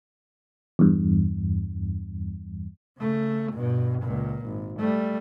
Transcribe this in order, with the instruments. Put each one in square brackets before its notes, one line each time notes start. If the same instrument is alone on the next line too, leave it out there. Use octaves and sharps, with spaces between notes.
[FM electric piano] E2 G2
[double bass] C#3 A3
G2 B2
C#2 A#2
G#1
G3 A3